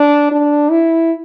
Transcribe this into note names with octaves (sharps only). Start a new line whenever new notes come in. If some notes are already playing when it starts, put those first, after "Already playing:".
Already playing: D4
D4
E4